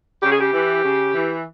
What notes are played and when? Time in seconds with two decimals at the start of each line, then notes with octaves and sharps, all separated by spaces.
0.23 C#3 G4
0.31 G#4
0.40 G4
0.52 E3
0.83 C#3
1.13 E3